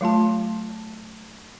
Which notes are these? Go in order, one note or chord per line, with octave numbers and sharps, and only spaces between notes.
F#3 A3 F4 A5